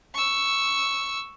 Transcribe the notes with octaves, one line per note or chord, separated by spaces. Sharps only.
C#6 E6